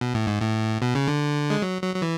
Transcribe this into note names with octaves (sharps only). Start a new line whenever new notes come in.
B2
A2
G#2
A2
B2
C#3
D3
G#3
F#3
F#3
F#3
E3